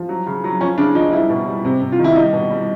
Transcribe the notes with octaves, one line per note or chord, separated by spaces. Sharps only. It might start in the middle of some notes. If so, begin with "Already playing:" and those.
Already playing: F3
F#3
C#3
F#3
F3 C#4
C#3 D4
F3 D#4
G3 E4
B2
G3
C3
C3
F4
D#3
E4
G3 D#4
B2
G3